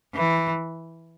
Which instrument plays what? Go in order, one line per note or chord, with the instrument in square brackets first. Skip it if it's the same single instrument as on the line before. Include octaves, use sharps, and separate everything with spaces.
[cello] E3